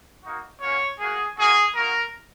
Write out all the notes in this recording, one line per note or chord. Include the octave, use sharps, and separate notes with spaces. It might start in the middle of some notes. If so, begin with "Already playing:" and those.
A#3 D#4 F#4
A#3 C#4 F#4 C#5
A#3 F#4 G#4
A#3 D#4 F#4 G#4
A#3 D#4 F#4 A#4